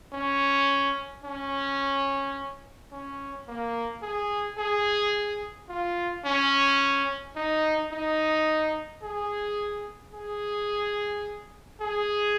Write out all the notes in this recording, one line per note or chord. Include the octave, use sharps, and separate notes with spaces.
C#4
C#4
C#4
A#3
G#4
G#4
F4
C#4
D#4
D#4
G#4
G#4
G#4